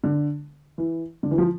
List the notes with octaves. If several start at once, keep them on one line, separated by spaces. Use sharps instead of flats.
D3
E3
D3
E3
F3